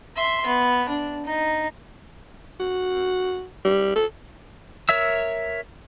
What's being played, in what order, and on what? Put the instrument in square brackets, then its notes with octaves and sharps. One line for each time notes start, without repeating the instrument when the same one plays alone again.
[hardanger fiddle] E5 C6
B3
D4
D#4
[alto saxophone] F#4
G3
A4
[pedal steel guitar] A#4 C#5 E5 E6